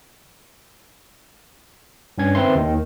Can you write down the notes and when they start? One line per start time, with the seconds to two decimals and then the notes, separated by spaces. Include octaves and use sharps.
2.18 G2 C#4 G#6
2.35 D#3 C4 B4 E5 C6
2.55 D#2 D#3